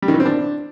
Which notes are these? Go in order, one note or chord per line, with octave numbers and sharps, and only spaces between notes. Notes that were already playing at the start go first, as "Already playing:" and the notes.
G3
D#3
E3
C4
D4